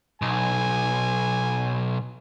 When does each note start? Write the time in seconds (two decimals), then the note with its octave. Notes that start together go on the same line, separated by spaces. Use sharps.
0.22 B1 G#5